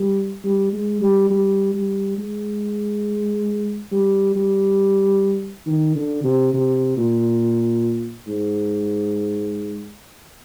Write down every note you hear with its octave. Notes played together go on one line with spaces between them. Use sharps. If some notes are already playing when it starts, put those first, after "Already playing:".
Already playing: G3
G3
G#3
G3
G3
G3
G#3
G3
G3
D#3
D3
C3
C3
A#2
G#2